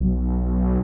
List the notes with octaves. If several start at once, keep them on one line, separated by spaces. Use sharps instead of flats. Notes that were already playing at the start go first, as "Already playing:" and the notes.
B1